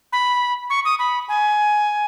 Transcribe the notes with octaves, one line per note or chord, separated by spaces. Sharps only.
B5
C#6
D#6
B5
G#5